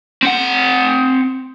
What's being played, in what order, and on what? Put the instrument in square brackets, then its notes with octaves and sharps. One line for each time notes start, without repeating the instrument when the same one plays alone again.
[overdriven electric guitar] C4 F#5